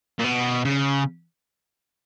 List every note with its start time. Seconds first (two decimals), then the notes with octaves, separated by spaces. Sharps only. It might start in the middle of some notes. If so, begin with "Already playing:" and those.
0.19 A#2
0.24 B2
0.65 C#3